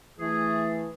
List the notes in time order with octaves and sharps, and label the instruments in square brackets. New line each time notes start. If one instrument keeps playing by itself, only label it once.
[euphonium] E3 [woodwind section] A3 G#4